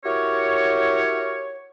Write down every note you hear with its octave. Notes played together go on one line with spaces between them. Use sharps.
E4 F#4 G4 A#4 C#5